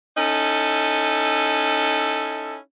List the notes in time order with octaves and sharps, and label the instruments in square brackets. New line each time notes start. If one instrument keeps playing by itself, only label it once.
[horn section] C#4 D#4 E4 A4